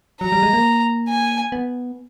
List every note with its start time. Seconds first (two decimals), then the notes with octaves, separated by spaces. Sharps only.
0.21 F#3 A#5
0.32 G3
0.42 G#3
0.53 A#3
1.09 G#5
1.52 B3